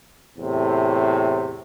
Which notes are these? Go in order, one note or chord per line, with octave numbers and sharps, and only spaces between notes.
E2 A2 C3